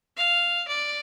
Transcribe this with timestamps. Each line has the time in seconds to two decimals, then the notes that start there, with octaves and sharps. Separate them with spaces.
0.17 F5
0.68 D5